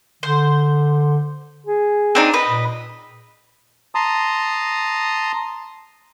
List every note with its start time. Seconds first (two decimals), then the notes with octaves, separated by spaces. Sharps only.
0.23 D3 C5
1.67 G#4
2.15 C4 D4 D#4
2.33 B4 D#5
2.48 A#2
3.95 A5 A#5 C6 D#6